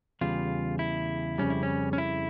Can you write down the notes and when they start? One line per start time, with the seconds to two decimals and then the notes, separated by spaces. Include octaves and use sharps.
0.21 E2 C#3 G3 F4
0.79 E4
1.38 F2 C#3 G3 C#4
1.50 E4
1.63 C#4
1.93 C#4
1.98 E4